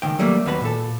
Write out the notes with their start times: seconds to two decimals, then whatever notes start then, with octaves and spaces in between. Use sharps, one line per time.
0.02 C#2 D#3 G5
0.19 F#3 G3 A3 A#3
0.46 D#2 B3 F#4 B4 A#5 B5
0.61 A#2 A4